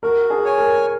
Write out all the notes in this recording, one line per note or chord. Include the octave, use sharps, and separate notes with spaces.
F#4 A#4
G#4
C#5 G#5
A#4